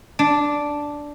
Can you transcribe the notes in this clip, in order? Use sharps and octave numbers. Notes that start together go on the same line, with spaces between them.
D4